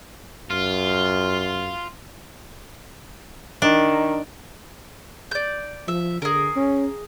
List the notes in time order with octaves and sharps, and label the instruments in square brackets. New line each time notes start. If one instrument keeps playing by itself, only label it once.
[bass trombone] F#2 [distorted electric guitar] F4
[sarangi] D#3 [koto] D4
[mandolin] D5 G6
[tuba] F3 [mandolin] E5
[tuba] D3 [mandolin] G#4 A#4
[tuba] C#4